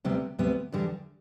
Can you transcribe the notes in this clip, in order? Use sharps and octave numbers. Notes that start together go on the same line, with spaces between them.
D2 C3 G3 B3
D2 C3 G3 B3
E2 D3 G3